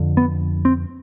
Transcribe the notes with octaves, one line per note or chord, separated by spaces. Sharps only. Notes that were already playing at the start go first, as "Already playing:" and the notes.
Already playing: F2 D3
B3
C4